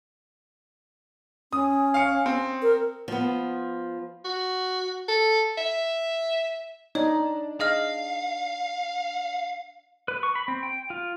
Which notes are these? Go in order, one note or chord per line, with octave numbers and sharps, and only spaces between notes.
C#4 D#6
F5 C#7
C4
A#4
F3 B3
F#4
A4
E5
D4 D#4 C#5
G#4 D#5 F5 F6
B4
C#6
B5
C4
G5
F4